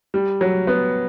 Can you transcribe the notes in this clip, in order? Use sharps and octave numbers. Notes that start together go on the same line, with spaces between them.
G3
F#3
B3